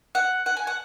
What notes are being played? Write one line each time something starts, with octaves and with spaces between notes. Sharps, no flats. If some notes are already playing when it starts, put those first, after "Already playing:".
F#5
F#5
G#5
F#5